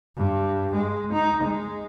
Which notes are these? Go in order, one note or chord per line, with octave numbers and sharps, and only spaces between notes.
G2
G#3
D#4
G#3